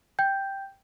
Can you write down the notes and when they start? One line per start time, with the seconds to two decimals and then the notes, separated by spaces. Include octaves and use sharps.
0.19 G5 G6